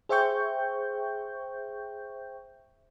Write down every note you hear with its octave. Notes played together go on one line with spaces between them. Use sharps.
G#4 C5 E5 G5 C#6 G6